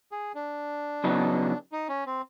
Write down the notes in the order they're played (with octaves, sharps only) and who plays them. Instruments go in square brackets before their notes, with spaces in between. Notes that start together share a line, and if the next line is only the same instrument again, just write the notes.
[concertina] G#4
D4
[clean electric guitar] C#3 F#3 B3 D#4
[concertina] D#4
C#4
C4